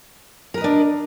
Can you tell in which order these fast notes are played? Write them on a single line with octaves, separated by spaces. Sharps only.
A#4 B4 D#5 D4